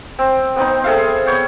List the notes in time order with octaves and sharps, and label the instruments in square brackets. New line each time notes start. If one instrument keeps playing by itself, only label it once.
[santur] C4
B3 C4 D#4
G#4 A4 E5 F5
B3 C#5 G5